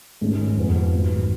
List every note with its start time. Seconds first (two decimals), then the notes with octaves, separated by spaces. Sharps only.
0.21 G#1 G#2 G#3 C#4 G#4
0.56 F1 F2 F3 G#3 B3
0.92 G#1 G#2 F#3